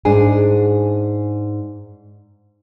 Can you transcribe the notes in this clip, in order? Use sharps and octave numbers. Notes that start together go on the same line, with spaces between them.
G#2 D4 G#4 G#5